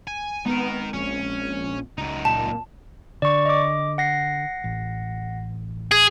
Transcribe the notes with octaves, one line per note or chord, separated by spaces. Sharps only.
G#5
G#3 B3 C4 D#4 A#4
A#1 C#4
C#2 F#2 D#4
A#2 A5
D3 D5 C#6
D#5 D6
F#5 A#6 C7
A1
G#4